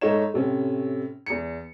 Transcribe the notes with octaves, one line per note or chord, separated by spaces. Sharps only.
G#2 A3 D#4 C#5 E7
A2 C3 C#4
E2 C#7